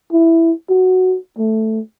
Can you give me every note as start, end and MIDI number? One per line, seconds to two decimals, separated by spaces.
0.12 0.52 64
0.69 1.16 66
1.38 1.80 57